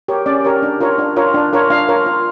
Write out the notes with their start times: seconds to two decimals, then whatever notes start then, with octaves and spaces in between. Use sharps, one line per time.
0.08 G4 A#4 C#5
0.26 C#4 D5
0.44 G4 A#4 C#5
0.63 D4
0.81 F4 A#4 C#5
0.98 D4
1.17 F4 A#4 C#5
1.34 D4
1.53 F4 A#4 C#5
1.70 D4 F5
1.89 F4 A#4 C#5
2.06 F4